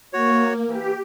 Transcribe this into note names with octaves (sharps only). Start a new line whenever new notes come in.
A#3 F#4 C#5
E3 G4